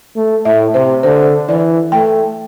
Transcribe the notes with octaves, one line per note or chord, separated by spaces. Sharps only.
A3
A2 E5
C3 C5
D3 C5
E3 D5
A3 G5